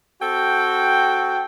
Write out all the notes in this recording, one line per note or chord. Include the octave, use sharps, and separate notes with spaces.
C4 F#4 A4 G5